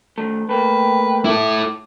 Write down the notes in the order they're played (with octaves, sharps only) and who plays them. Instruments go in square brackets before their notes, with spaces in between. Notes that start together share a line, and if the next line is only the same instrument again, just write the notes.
[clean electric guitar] D#3 A3
[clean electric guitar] A3 A#3 [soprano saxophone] B4 [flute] G5
[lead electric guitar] E4 A4 [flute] D6